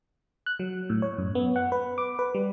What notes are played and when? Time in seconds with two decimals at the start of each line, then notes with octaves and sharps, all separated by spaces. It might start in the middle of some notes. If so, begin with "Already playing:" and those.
0.46 F#6
0.59 F#3
0.90 A2
1.02 C#5
1.18 F#2
1.35 B3
1.56 F#5
1.72 B4
1.98 D6
2.19 B4
2.35 G3